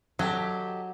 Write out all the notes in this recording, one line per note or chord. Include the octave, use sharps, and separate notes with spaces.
F#3 G4 A4 D#5